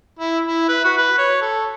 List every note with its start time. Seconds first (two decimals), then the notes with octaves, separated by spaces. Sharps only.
0.19 E4
0.46 E4
0.68 B4
0.84 F#4
0.98 B4
1.18 C#5
1.41 A4